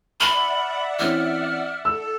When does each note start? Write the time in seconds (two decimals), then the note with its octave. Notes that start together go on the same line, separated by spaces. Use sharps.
0.20 D5 E5 F#5 B5 F6
0.99 E3 C4 C#4 F6
1.85 A4 E6